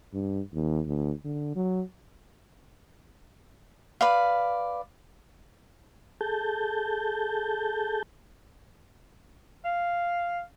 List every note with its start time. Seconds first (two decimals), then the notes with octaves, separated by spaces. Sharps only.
0.14 G2
0.54 D#2
0.87 D2
1.25 D3
1.56 F#3
4.01 B4 D5 F5
6.21 G#4 A4 A5 G6
9.65 F5